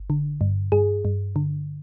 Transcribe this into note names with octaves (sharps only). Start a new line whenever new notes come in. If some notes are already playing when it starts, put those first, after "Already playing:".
Already playing: G1
D3
G2
G2 G#4
G2
D3